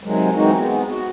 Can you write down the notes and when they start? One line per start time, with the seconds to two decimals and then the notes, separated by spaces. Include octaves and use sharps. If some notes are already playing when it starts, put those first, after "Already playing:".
0.04 C3 D#3 F#3 G#3
0.36 E3 G#3 A#3 C4 D#4 F#4
0.56 G#3 B3
0.89 F#4